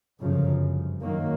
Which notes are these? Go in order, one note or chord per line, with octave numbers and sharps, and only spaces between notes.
G1 F#2 C#3 F3
F#2 D#3 F#3 A#3